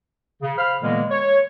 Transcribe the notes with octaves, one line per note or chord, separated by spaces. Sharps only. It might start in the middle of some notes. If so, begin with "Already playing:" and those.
C#3
C5 F5 B5 F6
A#2 D3 E3 G#3 A#3 B3
C#5